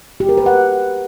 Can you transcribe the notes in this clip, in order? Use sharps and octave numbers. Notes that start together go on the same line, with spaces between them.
G4
A#4
B4
F#5